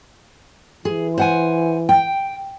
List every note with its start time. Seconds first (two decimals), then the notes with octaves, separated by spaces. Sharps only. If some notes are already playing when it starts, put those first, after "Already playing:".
0.85 E3 G#4
1.18 C5 F#5 G#5
1.89 G5